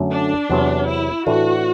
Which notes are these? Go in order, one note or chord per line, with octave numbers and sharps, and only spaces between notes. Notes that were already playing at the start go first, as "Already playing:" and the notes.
Already playing: F#2 D3 F#3 A3
D4
E2 C3 F#3 B3
E4
A2 E3 A3 D4 F#4